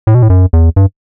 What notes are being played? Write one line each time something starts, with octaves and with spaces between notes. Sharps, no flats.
A2
B2
A2
F#2
E2
G2